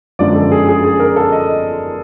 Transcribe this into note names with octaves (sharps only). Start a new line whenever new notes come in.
G1 F#2 D3 F3 G#3 D5
A4
G#4
G#4
G#4
A#4
A4
D#5